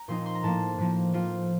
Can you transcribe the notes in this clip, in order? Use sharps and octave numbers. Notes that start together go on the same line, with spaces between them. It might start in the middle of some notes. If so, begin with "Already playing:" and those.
Already playing: A#5
A#2 F3 C4 D#4 C6
C6
A#5
A2 F3 A#3 A5
A2 F3 A#3
F3 C4 F4